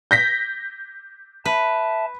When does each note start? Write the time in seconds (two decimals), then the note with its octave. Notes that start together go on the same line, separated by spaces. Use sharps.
0.11 G6 A#6 B6
1.45 B4 E5 A5